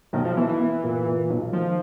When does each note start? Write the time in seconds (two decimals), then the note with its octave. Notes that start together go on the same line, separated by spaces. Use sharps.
0.13 B1 D#3
0.24 F3
0.36 E3 B3
0.49 E3
0.60 B3
0.84 A#2
1.06 A#2
1.30 B1
1.53 D#3 F3